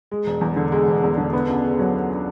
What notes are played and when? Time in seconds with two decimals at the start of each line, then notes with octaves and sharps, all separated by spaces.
0.12 G#3
0.27 E1
0.41 E2
0.56 D3
0.72 G#3
0.88 E1
1.03 E2
1.18 D3
1.33 B3
1.48 C#2
1.64 C#3
1.79 F#3
1.95 B3